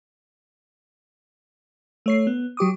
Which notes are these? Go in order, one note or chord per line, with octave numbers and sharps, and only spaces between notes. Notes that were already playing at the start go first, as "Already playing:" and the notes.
A3 C#5 C7
B3
F#3 G4 D6 D#6